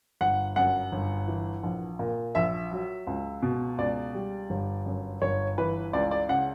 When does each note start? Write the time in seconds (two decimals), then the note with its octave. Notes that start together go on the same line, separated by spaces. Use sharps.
0.21 G1 F#5
0.56 F#2 F#5
0.92 G1
1.28 E3
1.63 A#1
1.99 A#2
2.35 A#1 E5
2.71 F#3
3.07 C#2
3.43 B2
3.78 C#2 D5
4.14 G3
4.50 G1
4.86 F#2
5.22 G1 C#5
5.58 E3 B4
5.93 C#2 D5
6.11 D5
6.29 C#3 F#5